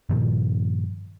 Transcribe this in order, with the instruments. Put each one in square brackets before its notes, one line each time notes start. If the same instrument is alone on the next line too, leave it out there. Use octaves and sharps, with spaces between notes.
[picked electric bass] G2 A#2 D#3 F3